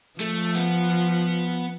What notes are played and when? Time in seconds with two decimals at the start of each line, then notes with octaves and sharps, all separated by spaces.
0.20 F3 A3
0.55 B3